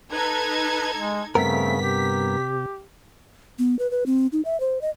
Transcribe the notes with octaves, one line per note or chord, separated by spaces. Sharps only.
D#4 A4 B4 G#6
G#3
G2 C#3 A3 B3 C4 A#4 B6
C3 G4
B3
B4
B4
C4
D#4
E5
C5
D#5